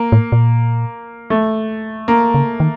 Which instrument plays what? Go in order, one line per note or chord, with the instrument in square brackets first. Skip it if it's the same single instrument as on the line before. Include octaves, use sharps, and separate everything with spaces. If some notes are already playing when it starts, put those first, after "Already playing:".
Already playing: [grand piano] A#3
[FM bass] A2
A#2
[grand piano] A3
A#3
[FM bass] C#3
D#3